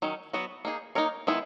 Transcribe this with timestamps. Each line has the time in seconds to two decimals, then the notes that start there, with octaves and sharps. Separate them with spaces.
0.02 D#3 F#3 C#4
0.33 F#3 B3 F#4
0.65 A#3 D#4 G#4
0.95 A#3 D#4 A#4 C#5
1.27 D#3 G#3 B3 E4